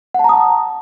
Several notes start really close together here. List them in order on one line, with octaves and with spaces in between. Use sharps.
F#5 A5 A#5 D#6